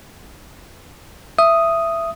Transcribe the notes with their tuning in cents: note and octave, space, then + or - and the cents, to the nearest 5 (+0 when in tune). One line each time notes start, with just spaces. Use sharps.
E5 +15 D#6 +0